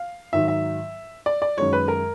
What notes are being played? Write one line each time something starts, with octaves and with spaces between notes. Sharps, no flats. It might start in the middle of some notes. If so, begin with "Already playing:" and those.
Already playing: F5
G#2 D#3 F#3 E5
E5
D5
D5
F#2 D#3 G#3 C#5
B4
A#4